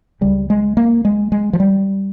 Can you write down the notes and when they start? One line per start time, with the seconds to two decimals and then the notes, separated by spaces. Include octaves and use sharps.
0.21 C#2 C#3 G3
0.50 G#3
0.77 A#3
1.05 G#3
1.32 G#3
1.53 F3
1.60 G3